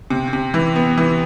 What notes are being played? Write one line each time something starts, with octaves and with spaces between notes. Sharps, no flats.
C3
C3
E3
B3
E3